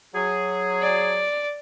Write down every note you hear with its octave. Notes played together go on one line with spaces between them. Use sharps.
F#3 G#4
D5